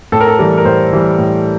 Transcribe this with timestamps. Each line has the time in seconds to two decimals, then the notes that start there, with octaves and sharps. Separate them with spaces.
0.12 A2 A4
0.21 A#4
0.28 A4
0.39 E3 G3 A#4
0.58 A#4
0.65 A2 C5
0.93 E3 G3
1.19 A2